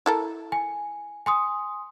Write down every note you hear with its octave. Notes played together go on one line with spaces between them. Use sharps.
E4 A4 A#4
G#5
G#5 C6 D#6